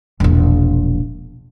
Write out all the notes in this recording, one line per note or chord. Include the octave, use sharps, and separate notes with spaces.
E1 A#1